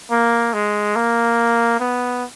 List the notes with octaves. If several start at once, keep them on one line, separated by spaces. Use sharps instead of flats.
A#3
G#3
A#3
B3